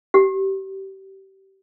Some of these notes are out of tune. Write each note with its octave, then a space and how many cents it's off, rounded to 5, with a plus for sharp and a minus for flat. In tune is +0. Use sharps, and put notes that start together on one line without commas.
G4 -25